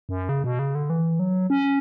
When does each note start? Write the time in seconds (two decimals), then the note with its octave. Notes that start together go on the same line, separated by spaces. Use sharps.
0.09 F#2
0.29 C#3
0.44 B2
0.59 C#3
0.75 D3
0.90 E3
1.19 F#3
1.50 C#4